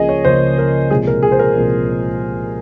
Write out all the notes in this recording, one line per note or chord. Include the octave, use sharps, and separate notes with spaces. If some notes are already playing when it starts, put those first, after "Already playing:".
Already playing: C#2 C#3 F3 A#3 G#4 D#5
C#5
C#2 C#3 F3 A#3 C5
A#4
C2 A#2 F3 G#3 G#4
A#4
G#4
C5
A#4
C2 A#2 F3 G#3